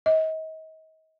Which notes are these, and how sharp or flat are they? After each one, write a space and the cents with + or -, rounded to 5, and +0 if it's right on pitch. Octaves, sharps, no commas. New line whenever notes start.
D#5 +35